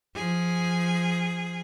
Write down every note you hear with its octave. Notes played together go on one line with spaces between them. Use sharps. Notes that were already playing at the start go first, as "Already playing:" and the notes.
F3 G#4